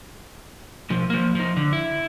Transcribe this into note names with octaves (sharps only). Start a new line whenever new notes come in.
B1 F3
F3 A#3
F3 D#4
D3
E4